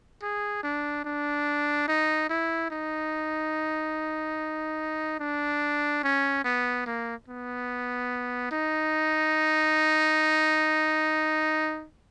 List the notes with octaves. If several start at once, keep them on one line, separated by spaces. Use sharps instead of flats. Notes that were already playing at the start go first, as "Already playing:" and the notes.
G#4
D4
D4
D#4
E4
D#4
D4
C#4
B3
A#3
B3
D#4